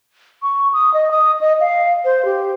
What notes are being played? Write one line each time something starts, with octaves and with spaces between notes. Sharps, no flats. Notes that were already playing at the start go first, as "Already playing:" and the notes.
C#6
D#6
D#5
D#6
D#5
F5
C5
G4